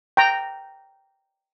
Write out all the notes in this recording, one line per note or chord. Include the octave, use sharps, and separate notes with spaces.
G5 A#5